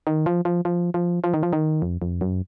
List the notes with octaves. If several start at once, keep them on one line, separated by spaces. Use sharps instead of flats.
D#3
F3
F3
F3
F3
F3
D#3
F3
D#3
F2
F2
F#2